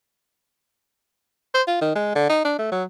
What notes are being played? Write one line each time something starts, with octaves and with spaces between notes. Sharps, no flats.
C5
F4
D#3
G#3
D3
D#4
D4
A3
F#3